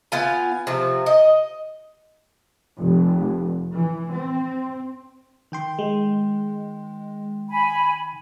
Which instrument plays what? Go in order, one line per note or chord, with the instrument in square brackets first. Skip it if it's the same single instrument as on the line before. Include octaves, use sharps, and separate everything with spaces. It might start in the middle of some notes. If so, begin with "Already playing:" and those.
[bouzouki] B3 F4 G#5
C3 F3
D#5
[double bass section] F1
E3
C4
[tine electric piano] D#3 G5 C6
[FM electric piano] G#3
[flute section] G#5 B5